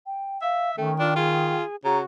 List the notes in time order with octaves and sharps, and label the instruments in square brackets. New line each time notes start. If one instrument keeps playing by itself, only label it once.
[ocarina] G5
[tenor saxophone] E5 [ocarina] F5
[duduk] D#3 [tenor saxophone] A3 [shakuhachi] C#4 [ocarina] G5
[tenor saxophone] D4 [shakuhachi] F4
[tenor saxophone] F4 [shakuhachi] G#4
[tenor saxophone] C#3 [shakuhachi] F#4 [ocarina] A#5